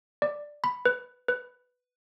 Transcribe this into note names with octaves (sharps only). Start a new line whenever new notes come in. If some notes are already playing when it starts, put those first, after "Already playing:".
D5
B5
B4
B4